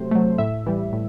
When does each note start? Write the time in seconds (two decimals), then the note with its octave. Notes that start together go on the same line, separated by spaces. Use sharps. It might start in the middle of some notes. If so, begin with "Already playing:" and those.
Already playing: C3 F#3 A3 C5
0.11 F#3 A3
0.38 A2 E5
0.66 E3 G3
0.93 A2